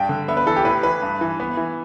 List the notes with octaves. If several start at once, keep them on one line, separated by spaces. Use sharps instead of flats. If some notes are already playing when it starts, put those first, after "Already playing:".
Already playing: G2 G3 G5
D3
B3 E5
B4
E3 A4
G4
A2 B4
E3 B4
G2
E3
B3
E3